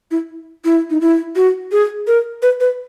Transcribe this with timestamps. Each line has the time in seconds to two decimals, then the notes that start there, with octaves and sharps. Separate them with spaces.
0.11 E4
0.65 E4
0.90 D#4
1.01 E4
1.36 F#4
1.72 G#4
2.07 A#4
2.42 B4
2.60 B4